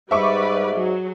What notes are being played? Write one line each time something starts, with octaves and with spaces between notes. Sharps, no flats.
G#2 G3 B4 D5 E5 C#6 D6
F#3 G#4